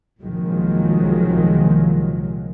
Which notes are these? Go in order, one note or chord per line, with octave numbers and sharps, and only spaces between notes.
C2 A#2 D#3 F3 F#3 G#3